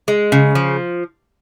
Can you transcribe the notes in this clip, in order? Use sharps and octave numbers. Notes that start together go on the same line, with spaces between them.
G#3
C#3
F3